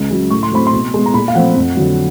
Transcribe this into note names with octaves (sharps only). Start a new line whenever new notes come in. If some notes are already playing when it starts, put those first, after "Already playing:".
Already playing: C#2
C#3 F#3
A2 C#6
C6
F#3 A3 C4 B5
C6
B2
G#3 B3
A#5
A#2 B5
F5
F3 A3 C4 F#5
F2
D3 F#3